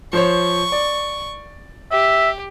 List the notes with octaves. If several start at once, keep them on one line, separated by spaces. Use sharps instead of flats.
F3 C5 C#5 C#6
D5
G4 E5